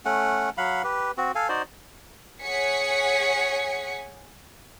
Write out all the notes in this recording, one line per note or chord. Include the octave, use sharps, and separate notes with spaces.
A3 C#4 F#5
F#3 F5 F#5 B5
G4 B4
C4 F#4
A4 F5 G#5
D#4 F#4 C5 D5
G#4 C#5 F#5 G#5 B6 C#7